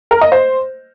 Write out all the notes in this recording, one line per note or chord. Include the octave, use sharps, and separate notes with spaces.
A#4
D#5
C5